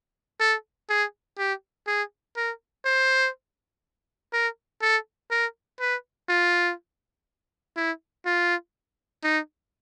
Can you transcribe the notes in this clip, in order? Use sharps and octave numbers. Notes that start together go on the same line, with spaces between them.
A4
G#4
G4
G#4
A#4
C5
A#4
A4
A#4
B4
F4
E4
F4
D#4